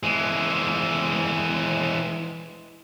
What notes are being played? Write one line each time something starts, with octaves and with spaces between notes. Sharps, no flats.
E3 G#3